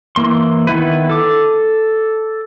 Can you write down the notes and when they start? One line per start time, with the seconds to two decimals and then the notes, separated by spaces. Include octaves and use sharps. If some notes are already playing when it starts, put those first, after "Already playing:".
0.16 E3 A#3 C6
0.67 D#3 B3 E4 B4
1.09 A4 D6